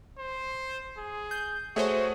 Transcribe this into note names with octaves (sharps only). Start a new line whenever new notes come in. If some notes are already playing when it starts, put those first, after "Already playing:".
C5
G#4
G6
A3 F#4 G#4 C5 C#5 E5